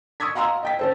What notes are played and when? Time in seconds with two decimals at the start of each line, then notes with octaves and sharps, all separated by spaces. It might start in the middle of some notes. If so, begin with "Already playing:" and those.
0.20 C#6 D#6 E6 G#6 B6
0.35 F5 F#5 A#5 C6 E6
0.63 D#5 G5 B6
0.79 C#4 A4 C5